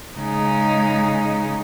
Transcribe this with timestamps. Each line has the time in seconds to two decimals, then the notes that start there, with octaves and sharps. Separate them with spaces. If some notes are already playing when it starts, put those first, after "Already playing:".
0.16 C#3 G#3 D#4